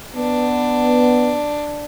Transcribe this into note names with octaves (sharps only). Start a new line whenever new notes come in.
B3 D4